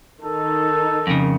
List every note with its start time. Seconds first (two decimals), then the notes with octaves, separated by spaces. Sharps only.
0.22 D#3 D#4 A4
1.07 F2 C#3